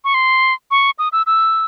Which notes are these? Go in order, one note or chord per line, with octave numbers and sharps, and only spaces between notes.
C#6
C6
C#6
D#6
E6
E6